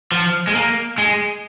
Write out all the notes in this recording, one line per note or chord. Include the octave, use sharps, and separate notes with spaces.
F3
G#3
A#3
G#3